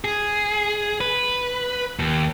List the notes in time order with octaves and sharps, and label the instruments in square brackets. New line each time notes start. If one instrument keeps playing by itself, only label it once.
[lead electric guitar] G#4
B4
D#2